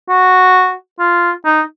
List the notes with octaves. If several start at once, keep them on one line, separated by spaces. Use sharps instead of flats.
F#4
F4
D#4